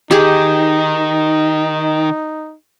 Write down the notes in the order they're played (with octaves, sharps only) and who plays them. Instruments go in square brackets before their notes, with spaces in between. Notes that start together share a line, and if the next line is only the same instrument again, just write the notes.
[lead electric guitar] D#3 [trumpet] D#4 [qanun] G4 G#4